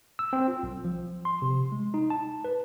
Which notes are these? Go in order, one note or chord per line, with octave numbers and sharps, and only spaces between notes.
E6
C4
F4
B1
F3
C6
C3
G#3
D#4
A5
B4